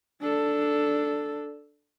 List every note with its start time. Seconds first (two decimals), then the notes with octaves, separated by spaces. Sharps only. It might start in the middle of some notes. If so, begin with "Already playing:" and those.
0.21 D4 A4